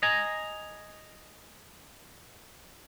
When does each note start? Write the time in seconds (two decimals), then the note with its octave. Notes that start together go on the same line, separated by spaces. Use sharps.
0.03 D#5 G#5 A#5